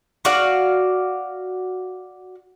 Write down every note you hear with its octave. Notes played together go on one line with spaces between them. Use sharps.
F#4 D5 F5 F#5